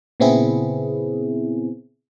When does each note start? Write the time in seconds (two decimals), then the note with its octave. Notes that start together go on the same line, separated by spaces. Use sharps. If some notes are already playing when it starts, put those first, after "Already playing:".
0.20 A#2 C#3 B3 C4 E4 G#4